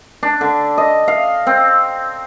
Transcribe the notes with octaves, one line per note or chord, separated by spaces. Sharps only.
D4
D3
D#5
F5
C4